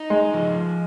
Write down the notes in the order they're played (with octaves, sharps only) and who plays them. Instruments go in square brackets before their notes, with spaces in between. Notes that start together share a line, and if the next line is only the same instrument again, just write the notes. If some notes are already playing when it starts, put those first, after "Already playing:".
Already playing: [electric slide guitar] D#4
[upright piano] G#3
[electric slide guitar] F3